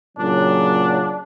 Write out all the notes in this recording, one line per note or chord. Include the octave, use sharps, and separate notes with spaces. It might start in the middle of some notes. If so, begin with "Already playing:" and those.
A#2 C#3 F#3 D4